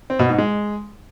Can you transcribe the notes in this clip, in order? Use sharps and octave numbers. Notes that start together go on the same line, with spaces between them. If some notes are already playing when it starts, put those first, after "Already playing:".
C4
B2
G#2
G#3